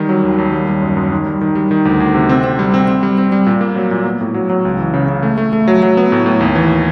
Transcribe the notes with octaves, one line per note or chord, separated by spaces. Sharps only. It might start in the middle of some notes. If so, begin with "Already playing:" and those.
Already playing: D#3 G3
F#3
D#2
D#2
G3
G3
F#2
F#2
D#3
G3
D#3
G3
D#3
D2
D2
C3
C4
C4
G3
C4
C4
G3
C4
G3
A#2
A#3
F#3
A#2
B3
A2
F#3
F#3
C#2
E3
C#3
C#3
A3
A3
A3
F#3
F#3
B3
A2
A2
D#2
E3